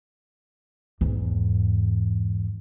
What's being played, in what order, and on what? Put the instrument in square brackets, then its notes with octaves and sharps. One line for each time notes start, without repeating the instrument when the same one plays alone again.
[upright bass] E2 G#2